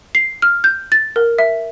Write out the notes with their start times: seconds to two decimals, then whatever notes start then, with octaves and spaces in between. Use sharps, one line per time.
0.15 C7
0.42 F6
0.64 G6
0.92 A6
1.16 A#4
1.39 E5